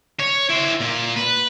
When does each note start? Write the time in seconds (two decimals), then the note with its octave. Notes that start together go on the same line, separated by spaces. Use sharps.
0.20 C#5
0.50 E4 C5
0.80 A#2
1.16 B4